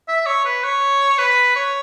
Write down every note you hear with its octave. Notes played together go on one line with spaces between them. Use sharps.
E5
C#5
B4
C#5
B4
C#5